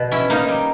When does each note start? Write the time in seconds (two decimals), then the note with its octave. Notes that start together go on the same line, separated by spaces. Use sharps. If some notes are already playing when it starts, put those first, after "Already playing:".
Already playing: B2
0.11 C#4 E4
0.30 A#3 D#4
0.48 G3